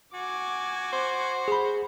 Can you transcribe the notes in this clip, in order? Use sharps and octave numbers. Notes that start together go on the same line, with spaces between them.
F#4 G#5 D6
C5
G#4 B5